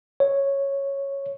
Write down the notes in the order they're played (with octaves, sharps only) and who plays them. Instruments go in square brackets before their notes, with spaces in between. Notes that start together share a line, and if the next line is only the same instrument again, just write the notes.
[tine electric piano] C#5